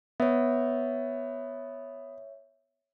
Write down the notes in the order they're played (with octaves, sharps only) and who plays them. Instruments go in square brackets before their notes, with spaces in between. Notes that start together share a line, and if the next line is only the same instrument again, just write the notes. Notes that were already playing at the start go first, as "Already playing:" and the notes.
[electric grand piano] B3 [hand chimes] C#5 E5